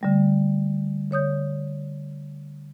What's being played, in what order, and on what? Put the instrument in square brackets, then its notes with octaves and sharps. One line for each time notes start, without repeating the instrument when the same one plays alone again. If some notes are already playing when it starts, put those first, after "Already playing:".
[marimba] D3 G3 A3
D3 C#5 D#6 G6